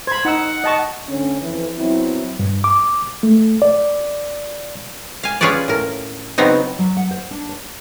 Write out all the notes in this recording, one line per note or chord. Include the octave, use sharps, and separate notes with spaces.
C5 B5 G#6
D#4 F#5 E6
D#5 A5 C#6
D2 D3 C#4
F2 E3
F#3 B3 C4 E4
G2
D6
A3
D5
F5 G#5
C#4 F4 G#4 B4 C#5 D5
A2 A#4
C#3 F#3 B3 C4 D#4
F#3
F#5
C5
D4
C#5